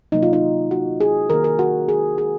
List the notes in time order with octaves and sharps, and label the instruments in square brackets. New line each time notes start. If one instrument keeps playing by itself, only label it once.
[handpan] C3 F#3 A#3 D#4
F4
D#4
F#4
G#4
D#3 A#3 A#4
A#4
F#4
G#4
G#4